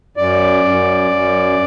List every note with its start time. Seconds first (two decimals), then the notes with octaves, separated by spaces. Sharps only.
0.17 F#2 D5
0.65 F#2
1.11 F#2